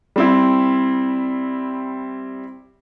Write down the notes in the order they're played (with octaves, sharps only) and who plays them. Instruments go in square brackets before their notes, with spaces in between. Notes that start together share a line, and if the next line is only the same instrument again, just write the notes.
[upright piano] G3 C4 E4